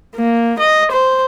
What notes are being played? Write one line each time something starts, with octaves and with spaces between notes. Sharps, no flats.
A#3
D#5
C5